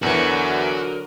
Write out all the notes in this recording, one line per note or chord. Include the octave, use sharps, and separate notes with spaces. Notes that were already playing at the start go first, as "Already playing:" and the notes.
E2 D3 E3 F#3 F#4 A#4